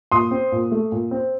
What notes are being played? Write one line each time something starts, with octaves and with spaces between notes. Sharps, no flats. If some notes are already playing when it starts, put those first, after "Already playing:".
A#2 C6 D#6
C4
A#2
A3
A#2
C4